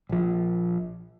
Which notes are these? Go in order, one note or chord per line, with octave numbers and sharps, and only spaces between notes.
A#1 F3